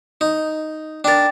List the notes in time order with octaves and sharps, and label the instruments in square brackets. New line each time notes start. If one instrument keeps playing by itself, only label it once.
[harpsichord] D#4
[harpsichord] D4 A#4 [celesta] G5 A6